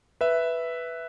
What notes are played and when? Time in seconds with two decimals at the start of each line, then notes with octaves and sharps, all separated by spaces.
0.21 B4 E5